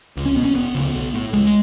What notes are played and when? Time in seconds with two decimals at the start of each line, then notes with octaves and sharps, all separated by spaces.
0.17 C#2
0.25 C#4
0.36 B2 B3
0.45 C#4
0.55 E1 B3
0.75 D2 C#3
0.94 B1
1.14 A2
1.33 C#2 G#3